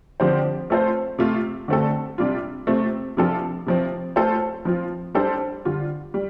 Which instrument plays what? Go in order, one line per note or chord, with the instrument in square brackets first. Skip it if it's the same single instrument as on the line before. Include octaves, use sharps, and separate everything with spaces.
[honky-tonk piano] D3 F3 C4 G4 C5
A3 C4 F4 A4 C5
C3 A3 F4
D3 A3 C4 A4
C3 G3 D4 F4
C3 A3 C4 F4
C3 F3 D4 F4 A4
C3 F3 C4
A3 F4 A4 C5
F3 C4 F4
G3 D4 A4 C5
D3 G3 F4
G3